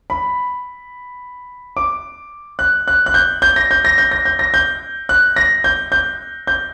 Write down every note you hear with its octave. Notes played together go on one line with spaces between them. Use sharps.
B5
D6
F#6
F#6
F#6
G6
G6
A#6
G6
A#6
G6
A#6
G6
A#6
G6
F#6
A#6
G6
G6
G6